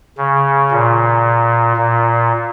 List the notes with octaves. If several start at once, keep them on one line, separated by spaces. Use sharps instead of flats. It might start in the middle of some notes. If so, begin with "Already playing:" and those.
C#3
A#2
A#2